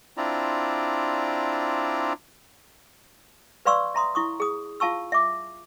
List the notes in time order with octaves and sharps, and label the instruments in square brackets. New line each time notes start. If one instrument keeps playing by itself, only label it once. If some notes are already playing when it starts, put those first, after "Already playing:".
[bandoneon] C4 D4 E4 F4 D5 A#5
[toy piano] B4 D5 F5 C6 C#6 E6
E5 A#5 C6 D#6
E4 C#6 D#6
G#4 D#6
F4 F5 A5 C#6 E6
E5 D6